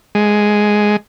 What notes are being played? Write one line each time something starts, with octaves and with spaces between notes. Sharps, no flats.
G#3